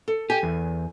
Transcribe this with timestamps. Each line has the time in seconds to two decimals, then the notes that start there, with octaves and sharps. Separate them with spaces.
0.08 A4
0.30 G4 G#5
0.43 E2